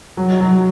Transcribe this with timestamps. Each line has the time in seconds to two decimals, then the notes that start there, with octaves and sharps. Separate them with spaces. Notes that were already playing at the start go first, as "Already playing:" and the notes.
0.17 F#3
0.40 F#3